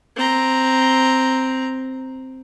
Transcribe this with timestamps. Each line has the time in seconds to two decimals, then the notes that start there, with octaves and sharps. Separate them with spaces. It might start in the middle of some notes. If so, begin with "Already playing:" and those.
0.16 C4 A#5